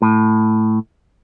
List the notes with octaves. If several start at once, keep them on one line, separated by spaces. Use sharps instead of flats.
A2